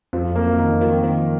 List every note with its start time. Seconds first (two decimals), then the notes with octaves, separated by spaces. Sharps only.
0.13 F2 F3
0.35 F#2 A#3
0.57 D#3 D#4
0.80 D#3 F3
1.03 D#3 F3